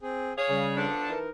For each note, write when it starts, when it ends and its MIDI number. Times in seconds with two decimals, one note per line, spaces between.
0.01 0.33 60
0.01 0.33 68
0.37 0.75 68
0.37 0.75 73
0.37 0.67 77
0.37 0.67 87
0.49 0.87 49
0.49 0.87 55
0.77 1.11 53
0.77 1.11 59
0.77 1.11 62
0.77 1.18 69
0.77 1.18 81
1.09 1.29 52
1.09 1.29 63
1.09 1.29 70